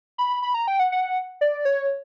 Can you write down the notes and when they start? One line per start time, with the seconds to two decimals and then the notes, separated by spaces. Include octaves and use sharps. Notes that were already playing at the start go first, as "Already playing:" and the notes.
0.18 B5
0.42 B5
0.54 A#5
0.68 G5
0.80 F#5
0.92 F#5
1.41 D5
1.65 C#5